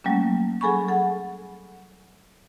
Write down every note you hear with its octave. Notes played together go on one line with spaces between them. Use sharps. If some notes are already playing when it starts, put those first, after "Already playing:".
F#3 G3 A3 A#3 C#4
F#3 G#4 A4 G#5 B5 C#6
A4 F#5